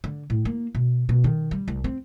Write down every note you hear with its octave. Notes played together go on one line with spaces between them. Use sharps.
D3
A2
A#3
B2
B2
D#3
G3
C2
C4